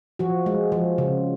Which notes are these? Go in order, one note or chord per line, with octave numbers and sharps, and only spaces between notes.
F3 F#4
G#3
F3
C#3